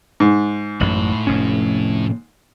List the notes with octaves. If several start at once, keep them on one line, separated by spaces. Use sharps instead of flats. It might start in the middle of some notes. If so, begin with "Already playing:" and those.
G#2
A1 F#2 A2 B5
F1 F2 C#4